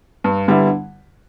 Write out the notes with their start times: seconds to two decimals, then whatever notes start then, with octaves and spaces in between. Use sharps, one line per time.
0.24 G2
0.48 D3 G3 B3 E4